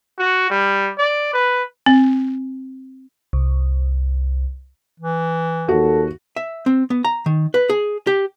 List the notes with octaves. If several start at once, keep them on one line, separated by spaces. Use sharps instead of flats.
F#4
G3
D5
B4
C4
C2
E3
D#2 F#4 A4
E5
C4
B3
A#5
D#3
B4
G#4
G4